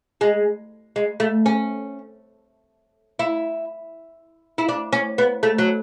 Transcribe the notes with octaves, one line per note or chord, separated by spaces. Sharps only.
G#3
G#3
A3
C#4
E4
E4
D4
C#4
B3
A3
F#3